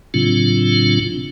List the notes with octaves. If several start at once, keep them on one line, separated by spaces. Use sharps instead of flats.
A2 C#3 F#3 C4 D4 F4